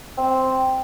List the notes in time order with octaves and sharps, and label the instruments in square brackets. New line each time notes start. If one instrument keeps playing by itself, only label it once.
[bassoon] C4